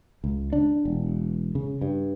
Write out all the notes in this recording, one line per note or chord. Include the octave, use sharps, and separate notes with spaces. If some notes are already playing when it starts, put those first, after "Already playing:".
C#2
D4
E1
C#3
G2